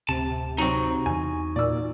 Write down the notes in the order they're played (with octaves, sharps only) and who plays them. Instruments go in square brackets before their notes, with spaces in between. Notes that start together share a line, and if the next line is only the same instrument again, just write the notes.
[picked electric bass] D1 [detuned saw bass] C3 [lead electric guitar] A5
[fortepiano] F#3 C4 [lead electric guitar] D#4 F#4
[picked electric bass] E2 E3 [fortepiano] G#5
[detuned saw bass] A#2 [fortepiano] D5 E6